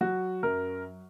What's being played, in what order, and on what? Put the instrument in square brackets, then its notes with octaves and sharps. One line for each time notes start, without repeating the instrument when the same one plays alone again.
[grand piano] F#3 F#4
F#2 A#4